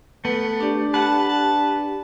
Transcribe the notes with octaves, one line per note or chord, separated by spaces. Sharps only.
A3 B3
D4 G4 D5
B4 F#5 A5
A5